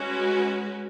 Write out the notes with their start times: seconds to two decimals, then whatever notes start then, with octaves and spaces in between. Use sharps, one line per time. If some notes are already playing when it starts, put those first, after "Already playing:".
Already playing: G#3 C#4 F#4 B4